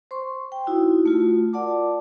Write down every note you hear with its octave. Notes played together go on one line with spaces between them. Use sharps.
C5 C6 C#6
G5
D#4 E4 F#4
A3 F4 F#4
F4 A#4 D5 F#5 A5 D6